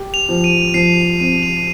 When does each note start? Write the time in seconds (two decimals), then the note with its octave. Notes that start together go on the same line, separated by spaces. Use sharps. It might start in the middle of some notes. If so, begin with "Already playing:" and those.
Already playing: G4
0.14 F7
0.29 F3
0.44 D#7
0.74 F3 C7
1.20 C4 D#7
1.43 F7